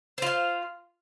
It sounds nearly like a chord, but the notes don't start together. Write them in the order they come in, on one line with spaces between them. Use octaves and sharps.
C5 F4 F5